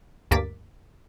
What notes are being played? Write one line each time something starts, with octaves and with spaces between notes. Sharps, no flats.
D2 G2 A#3 D6 A6 B6